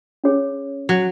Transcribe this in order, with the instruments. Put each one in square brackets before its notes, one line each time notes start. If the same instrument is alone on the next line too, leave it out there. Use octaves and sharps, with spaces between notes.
[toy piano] C#4 G#4 C#5
[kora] F#3